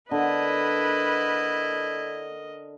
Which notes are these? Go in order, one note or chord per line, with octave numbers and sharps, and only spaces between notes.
D3 E4 A#4 B4 D#5